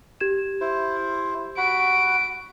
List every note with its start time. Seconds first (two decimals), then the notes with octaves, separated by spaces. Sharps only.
0.20 G4 G#6 E7
0.61 E4 C5
1.57 F#4 F#5 B5 D7